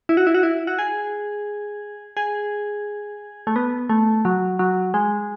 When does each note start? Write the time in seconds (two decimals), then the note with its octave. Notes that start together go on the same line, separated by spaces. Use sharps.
0.09 E4
0.17 F#4
0.27 E4
0.34 F#4
0.43 E4
0.67 F#4
0.79 G#4
2.17 G#4
3.47 A3
3.56 B3
3.89 A3
4.25 F#3
4.59 F#3
4.94 G#3